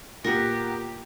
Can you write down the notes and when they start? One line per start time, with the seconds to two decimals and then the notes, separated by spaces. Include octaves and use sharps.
0.24 A#2 B3 G4 A#4